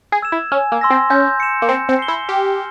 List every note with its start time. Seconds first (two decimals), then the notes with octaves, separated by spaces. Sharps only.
0.12 G#4
0.22 E6 G#6 E7
0.32 E4
0.52 C#4 G#5
0.72 A#3
0.81 C6 E6 A#6
0.90 C4
1.10 C#4 G6
1.40 C#7 E7
1.62 A#3
1.69 C4 G6
1.89 C4
1.99 C7 G7
2.08 E4
2.28 G4 F6